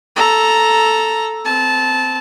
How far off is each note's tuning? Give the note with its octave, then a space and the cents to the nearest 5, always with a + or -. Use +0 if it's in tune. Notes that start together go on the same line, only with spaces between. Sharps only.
A4 +0 A#5 +5
C4 -20 A5 -15